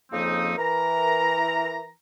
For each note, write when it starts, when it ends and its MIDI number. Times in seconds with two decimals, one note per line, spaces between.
0.12 0.54 41
0.12 0.54 49
0.12 0.54 53
0.12 0.54 58
0.12 0.54 60
0.12 0.54 63
0.58 1.89 52
0.58 1.89 70
0.58 1.89 82